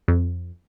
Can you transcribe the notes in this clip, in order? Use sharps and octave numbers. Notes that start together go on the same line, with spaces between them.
F2